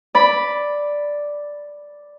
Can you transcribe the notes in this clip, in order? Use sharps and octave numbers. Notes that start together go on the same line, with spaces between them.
D5 B5